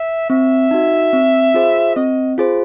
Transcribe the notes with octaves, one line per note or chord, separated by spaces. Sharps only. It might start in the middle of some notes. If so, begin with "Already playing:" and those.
Already playing: E5
C4 E5
D#4 F#4
C4
F4 G#4 C5
C4 D#5
F4 G#4 C5